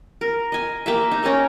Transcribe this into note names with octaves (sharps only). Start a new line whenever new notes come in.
A#4
D#5 G#5
A#3 G4 E5
D#4
C#4 D#4 A#4 D#5